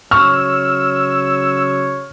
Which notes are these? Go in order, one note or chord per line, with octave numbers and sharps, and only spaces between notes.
C#3 F#3 C#5 C#6 E6 F6